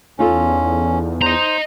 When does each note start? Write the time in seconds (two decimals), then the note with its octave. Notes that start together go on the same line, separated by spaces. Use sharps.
0.19 E2 C#4 D#4 F4 A4
1.22 C5 D#5 A#5